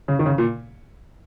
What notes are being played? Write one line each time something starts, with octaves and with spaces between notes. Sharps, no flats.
C#3
D#3
C#3
A#2